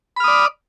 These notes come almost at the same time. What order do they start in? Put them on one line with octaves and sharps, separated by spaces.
B5 F6 D#6 D5